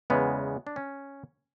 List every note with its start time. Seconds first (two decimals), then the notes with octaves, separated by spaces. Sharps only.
0.10 E2 C#3 G#3 B3
0.67 D4
0.76 C#4